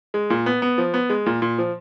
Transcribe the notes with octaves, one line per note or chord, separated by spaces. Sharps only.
G#3
A#2
B3
B3
F3
B3
G#3
A#2
A#2
F3